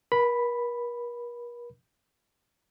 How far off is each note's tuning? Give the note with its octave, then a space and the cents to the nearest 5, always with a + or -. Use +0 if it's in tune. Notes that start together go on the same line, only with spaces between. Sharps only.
A#4 +45 B5 +0